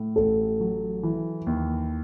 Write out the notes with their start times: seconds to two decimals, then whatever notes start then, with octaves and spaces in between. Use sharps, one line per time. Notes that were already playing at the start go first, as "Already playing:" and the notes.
Already playing: A2
0.16 A1 A4
0.60 F#3
1.03 E3
1.47 D#2